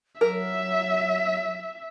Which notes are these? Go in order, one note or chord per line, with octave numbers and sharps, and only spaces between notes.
F#3 A#4 E5